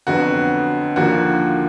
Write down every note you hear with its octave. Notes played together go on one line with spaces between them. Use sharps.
F2 D3 F#3 B3 F#4
D#2 D3 F3 A#3 F#4